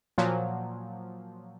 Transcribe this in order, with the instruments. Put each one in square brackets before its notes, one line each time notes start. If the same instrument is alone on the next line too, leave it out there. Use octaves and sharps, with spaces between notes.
[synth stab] A#2 F3 F#3